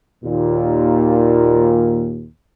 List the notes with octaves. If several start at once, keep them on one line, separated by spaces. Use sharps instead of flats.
D#2 A#2